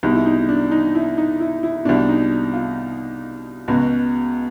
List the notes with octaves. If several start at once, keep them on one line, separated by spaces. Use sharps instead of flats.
C2 B2 D#4
E4
D#4
D#4
D4
D#4
E4
D#4
E4
E4
C2 B2 D4
D#4
F4
C#2 B2 F#4